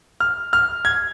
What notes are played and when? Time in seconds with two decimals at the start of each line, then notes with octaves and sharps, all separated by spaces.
0.20 F6
0.53 F6
0.85 G#6